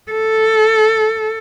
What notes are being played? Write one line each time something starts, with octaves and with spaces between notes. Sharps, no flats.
A4